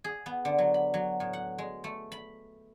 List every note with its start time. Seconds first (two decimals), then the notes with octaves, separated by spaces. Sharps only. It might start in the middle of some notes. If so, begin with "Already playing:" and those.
0.04 G#4
0.26 B3
0.45 D3
0.58 F#3
0.74 B5
0.94 F#3
1.20 A2
1.33 F#5
1.58 G#3
1.84 A3
2.12 B5